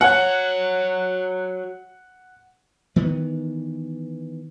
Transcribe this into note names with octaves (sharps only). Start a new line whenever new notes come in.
F#4 C#5 F#5
D#3 E3 B3